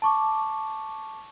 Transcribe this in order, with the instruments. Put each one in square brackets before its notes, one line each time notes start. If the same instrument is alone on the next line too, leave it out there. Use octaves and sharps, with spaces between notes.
[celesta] A5 C#6 D6